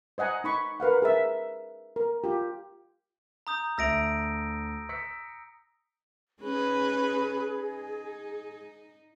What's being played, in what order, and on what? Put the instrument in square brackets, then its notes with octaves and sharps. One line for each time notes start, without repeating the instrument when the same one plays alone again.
[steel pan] C5 D#5 F#5 G#5 A#5
D#4 B5 C#6
A#4 B4 F5 F#5
G#4 A#4 E5
A#4
F4 G4
[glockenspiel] A#5 D#6 G6
[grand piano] D2 E5 F7 [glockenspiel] E6 A#6 D7
[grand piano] E6 B6 C#7
[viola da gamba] C#4 D#4 B4 [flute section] G#4
[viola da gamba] D#4